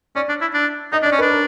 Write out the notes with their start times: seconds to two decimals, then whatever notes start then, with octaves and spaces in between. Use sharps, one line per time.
0.15 C#4 D5
0.29 D4
0.41 E4
0.54 D4
0.92 D#4 D#5
1.03 D4
1.06 D5
1.12 C#4
1.19 D4 B4
1.31 A#4